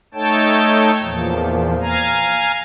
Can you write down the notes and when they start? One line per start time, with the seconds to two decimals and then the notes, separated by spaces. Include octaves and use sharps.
0.14 A3 D#4 A4 C#5 G5 A5
1.01 E2 A#2 F3
1.82 F5 G#5 A#5